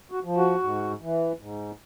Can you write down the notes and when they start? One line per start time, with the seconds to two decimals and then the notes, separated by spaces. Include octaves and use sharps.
0.12 F#4
0.24 F3
0.38 F#4
0.63 G#2
1.01 E3
1.40 G#2